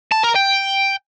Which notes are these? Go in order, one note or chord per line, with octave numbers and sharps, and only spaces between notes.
A5
A#4
G5